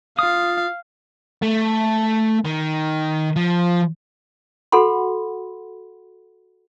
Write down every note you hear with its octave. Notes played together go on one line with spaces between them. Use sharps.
F4 F5 D#6
A3
D#3
F3
F#4 A4 F#5 B5 C6